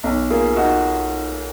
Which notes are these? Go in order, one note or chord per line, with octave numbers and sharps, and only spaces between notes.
B1
A#3 F4 G#4
D#4 F#4